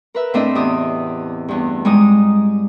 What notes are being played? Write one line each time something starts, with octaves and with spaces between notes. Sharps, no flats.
A#4 B4 E5
A2 A3 C4 D4 D#5 E5
E2 G4 D#6
E2 G2
G#2 G3 G#3 D#4 D#6